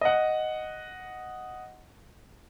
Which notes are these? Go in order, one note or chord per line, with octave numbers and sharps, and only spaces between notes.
D#5 F#5